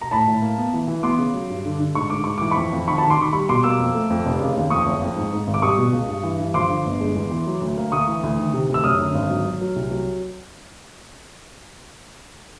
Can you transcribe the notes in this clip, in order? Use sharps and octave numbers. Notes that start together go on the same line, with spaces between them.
A#5
A2 A5 B5
A2
A#3
B3
E3
E3
B3 C6 D6
C#3
F#3
G2
D3
D3
G#2 C#6
G#2 D6
G#2 C#6
E3 D6
F2 B5 C#6
F2
D#3 B5 C#6
A5 B5
D#3
C6 D6
D#3 B5 C#6
G3 B5 C#6
B2 C6 D6
A#3 D6 E6
F2
A3
F2
F1
C#3
D#2
F2 C#6 D#6
F#1
F2
G#2
G#2
G#1
D6
G3 C#6 D#6
B2
C#2
G2
E3
G2
F3 C6 D6
D3
G1
G#3
E2
E3
F#3
D2
A#3
D2 C#6 D#6
E3
D2
D#3
C3
D2 E6
F#2 D#6 F6
D3
G#1
F#3
F#3
F#3
C2
F#3